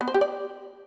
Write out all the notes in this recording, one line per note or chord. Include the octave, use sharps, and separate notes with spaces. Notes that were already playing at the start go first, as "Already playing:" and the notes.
B3
C5
G4
D5